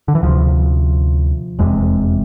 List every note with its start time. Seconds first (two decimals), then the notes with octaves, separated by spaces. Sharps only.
0.08 D3
0.15 E3
0.23 D2 C3 F3
1.59 F1 E2 C3 G#3